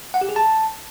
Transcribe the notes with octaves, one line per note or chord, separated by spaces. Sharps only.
F#5
G4
G#4
A5